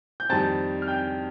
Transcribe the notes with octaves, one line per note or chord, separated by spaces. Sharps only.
G6
F2 D#3 G3 C4 A5 A6
F6
G5 G6